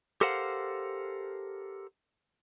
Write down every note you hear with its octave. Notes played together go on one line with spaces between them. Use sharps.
G4 A4 A#4 C5 F5 F#5